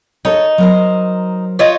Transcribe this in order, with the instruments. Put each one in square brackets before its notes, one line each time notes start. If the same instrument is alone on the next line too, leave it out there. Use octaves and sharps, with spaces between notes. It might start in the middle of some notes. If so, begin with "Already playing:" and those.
[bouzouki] D#4 [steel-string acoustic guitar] A4 A#4 C#5
[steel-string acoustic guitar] F#3 A#4 C5
[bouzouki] D#4 F4 C#5